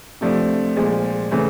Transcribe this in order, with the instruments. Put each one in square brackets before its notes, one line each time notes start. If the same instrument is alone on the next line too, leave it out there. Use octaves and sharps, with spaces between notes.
[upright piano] C3 F3 A3 D4
A#2 F3 G#3
C#3 E3 A3